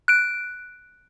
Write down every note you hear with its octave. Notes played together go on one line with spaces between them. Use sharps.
F#6 D7